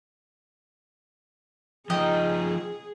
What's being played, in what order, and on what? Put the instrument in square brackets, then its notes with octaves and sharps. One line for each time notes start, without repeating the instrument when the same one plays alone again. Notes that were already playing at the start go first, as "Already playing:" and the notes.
[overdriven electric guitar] F3 D#4 [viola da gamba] G#4 [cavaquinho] D#5 G5 A#5